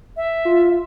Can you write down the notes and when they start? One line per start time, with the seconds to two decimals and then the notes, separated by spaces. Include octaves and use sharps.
0.17 E5
0.45 F4